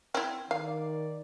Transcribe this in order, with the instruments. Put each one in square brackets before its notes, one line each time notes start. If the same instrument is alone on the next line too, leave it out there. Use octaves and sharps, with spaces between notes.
[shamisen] C4 E4
[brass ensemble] D#3 D5 [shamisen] F5